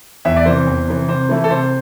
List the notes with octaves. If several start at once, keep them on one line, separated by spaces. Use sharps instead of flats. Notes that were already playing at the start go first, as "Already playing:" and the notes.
E2 E5
D5
C3 E3 C5
E2
C3 E3
C3 C5
E3 A3 E4
A4
C3 C5